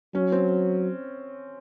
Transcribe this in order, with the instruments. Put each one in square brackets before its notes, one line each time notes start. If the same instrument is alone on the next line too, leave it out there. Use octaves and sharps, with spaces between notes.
[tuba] F#3 [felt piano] C#4
[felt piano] C4